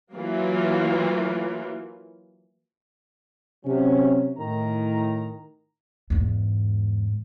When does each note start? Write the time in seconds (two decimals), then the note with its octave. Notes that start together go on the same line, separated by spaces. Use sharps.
0.14 E3 F#3 A#3 F4 A#4
3.66 C3 F#3 C#4
4.39 A2 D#3 A#5
6.10 E2 G#2